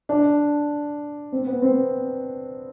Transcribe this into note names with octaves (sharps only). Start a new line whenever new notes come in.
D4
C4
B3
C4